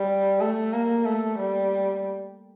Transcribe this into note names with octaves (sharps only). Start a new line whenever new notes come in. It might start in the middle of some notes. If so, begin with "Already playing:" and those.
Already playing: G3
A3
A#3
A3
G3